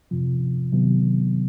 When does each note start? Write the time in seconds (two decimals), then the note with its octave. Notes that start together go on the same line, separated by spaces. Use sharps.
0.11 F2 C3 F3
0.72 C3 D#3 F#3 B3